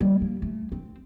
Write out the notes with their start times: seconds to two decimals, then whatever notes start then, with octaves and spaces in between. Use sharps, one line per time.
0.01 G3
0.21 A#3
0.42 A3
0.72 C4